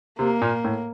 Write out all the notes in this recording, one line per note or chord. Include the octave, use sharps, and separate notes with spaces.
C3 A#3
A#2
A2